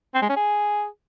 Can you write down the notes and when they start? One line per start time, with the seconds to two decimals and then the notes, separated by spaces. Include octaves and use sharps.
0.15 C4
0.22 G#3
0.29 C#4
0.36 G#4